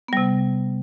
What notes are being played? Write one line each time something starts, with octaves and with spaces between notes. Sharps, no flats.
C3 G3 B3